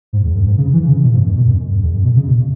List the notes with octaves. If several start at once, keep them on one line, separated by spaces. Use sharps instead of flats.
G#2
E2
F#2
G#2
C#3
E3
C#3
B2
G#2
F#2
B2
F#2
F#2
E2
F#2
B2
C#3
B2